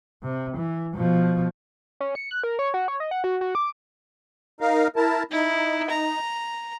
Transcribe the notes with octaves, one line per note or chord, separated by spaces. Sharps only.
C3
E3
B2 F3
C#4
C#7
F#6
A#4
C#5
F#4
C#5
D#5
F#5
F#4
F#4
D6
D#4 A#4 F5
E4 A#4 A5
D#4 E4
A#5